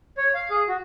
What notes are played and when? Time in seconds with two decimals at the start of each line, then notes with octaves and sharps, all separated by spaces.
0.18 C#5
0.35 F5
0.50 G#4
0.68 F#4